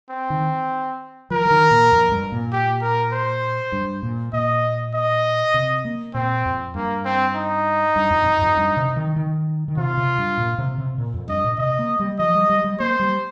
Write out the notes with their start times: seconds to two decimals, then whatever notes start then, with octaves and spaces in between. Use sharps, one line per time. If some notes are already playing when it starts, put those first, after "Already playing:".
0.10 C4
0.30 D#3
1.31 F3 A#4
1.45 F3
1.51 D#3
1.71 A#2
1.92 F2
2.12 G2
2.32 A#2
2.53 G4
2.82 A#4
3.12 C5
3.72 G2
4.03 A#2
4.33 A#2 D#5
4.94 D#5
5.54 C3
5.85 A#3
6.14 A#2 C4
6.45 F2
6.75 G2 A#3
7.05 C4
7.35 D#4
7.96 G2
8.10 F2
8.26 G2
8.41 F2
8.57 G2
8.77 C3
8.96 D#3
9.16 D#3
9.68 D#3
9.77 C3 F4
9.97 C3
10.18 G2
10.38 A#2
10.58 C3
10.78 C3
10.98 A#2
11.14 F2
11.28 G2 D#5
11.44 A#2
11.58 C3 D#5
11.79 A#3
12.00 G3
12.19 F3 D#5
12.34 G3
12.50 G3
12.64 G3
12.80 A#3 C5
13.00 G3